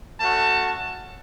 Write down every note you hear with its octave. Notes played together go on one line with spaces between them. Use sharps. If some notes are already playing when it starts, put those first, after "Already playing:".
A3 C#4 F#4 A5